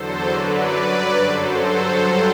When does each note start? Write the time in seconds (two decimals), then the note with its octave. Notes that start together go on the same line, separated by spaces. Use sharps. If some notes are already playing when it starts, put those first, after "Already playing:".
Already playing: E2 D3 F#3 A4 C5
0.30 F#2 D3 F#3 B4 D5
0.75 G2 F#3
1.20 F#2 D3 F#3 A4 C5
1.64 G2 F#3